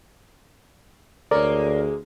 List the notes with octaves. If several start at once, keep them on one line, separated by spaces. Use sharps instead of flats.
D2 G#3 A#3 A#4 C#5 D5